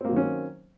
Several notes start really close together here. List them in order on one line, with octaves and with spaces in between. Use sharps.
C4 A#3 F#3 D#3 C#4